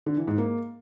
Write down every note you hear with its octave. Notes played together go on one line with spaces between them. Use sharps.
D3
E3
G#2
A#3